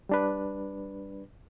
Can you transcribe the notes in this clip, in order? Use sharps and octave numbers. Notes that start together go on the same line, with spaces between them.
G3 D4 B4